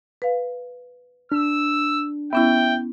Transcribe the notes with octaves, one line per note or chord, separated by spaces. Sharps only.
B4 F5
D4 E6
B3 C#4 E4 E5 G5